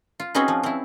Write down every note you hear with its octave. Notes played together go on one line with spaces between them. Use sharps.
F4
C4 C#4 D#4 F#4 G#4 B4
F3
C4 E4